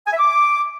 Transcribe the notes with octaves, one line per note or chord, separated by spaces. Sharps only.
G#5
E5
D6